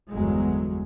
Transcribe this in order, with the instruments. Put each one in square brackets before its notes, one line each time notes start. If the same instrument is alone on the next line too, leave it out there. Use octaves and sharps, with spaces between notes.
[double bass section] G1 E2 F#3 G#3